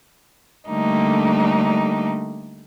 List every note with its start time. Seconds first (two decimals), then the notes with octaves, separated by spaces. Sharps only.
0.70 D3 G3 A3 A#3 D4 D#4